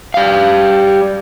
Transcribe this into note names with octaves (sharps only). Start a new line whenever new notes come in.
G3 F5